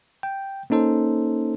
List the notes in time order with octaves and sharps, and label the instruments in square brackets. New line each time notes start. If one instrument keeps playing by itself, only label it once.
[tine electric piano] G5
A#3 C#4 D#4 A4 C5